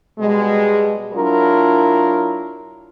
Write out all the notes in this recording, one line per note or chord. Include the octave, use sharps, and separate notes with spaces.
B2 G3 G#3
F#3 D4 E4 F4 A#4